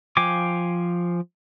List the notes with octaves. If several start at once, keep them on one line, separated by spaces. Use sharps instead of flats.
F3 F5 G5 G#5 D6